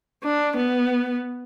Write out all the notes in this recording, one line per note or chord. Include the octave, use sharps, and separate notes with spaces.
D4
B3